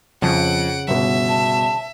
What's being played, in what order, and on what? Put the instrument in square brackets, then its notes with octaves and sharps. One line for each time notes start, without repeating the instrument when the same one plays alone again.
[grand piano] F2 [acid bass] C#3 [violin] F#5 D7
[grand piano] G1 B2 [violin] E5
[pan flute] A5